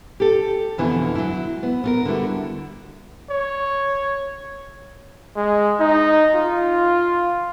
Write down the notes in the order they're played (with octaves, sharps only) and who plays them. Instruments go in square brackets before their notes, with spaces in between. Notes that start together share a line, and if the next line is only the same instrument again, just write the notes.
[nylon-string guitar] G4 A4
F2 B2 D3 E3 B3 E4
F#3 E4
B3
B3 F4 A#4
D3 G3 E4 F#4
[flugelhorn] C#5
G#3
D#4
F4